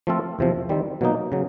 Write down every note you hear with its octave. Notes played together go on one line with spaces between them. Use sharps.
F3 A3 C4 F4 A4
E2 C3 F3
D#3 G3 C4
B2 F#3 A#3 D#4
C#3 F#3